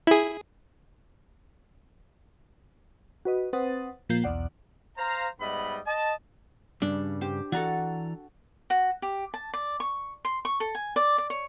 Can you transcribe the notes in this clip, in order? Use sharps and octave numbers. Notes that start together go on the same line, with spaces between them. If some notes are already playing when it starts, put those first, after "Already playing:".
E4 G#4
F#4 B4 D#5
C4 B4 C5 F#5 D#6 A6
A#2 F3 A#3 G6 C7
B1 E2 D5 F#5
C5 F5 A#5
G#2 G3 B3 D#5 E5 B5
D#5 A5
G2 C#3 G3 D4
G4 C5
E3 F#4 A4 D5 A#5
F#4
G4
A5
D5
C#6
C6
C#6
A4
G#5
D5
D5
C#5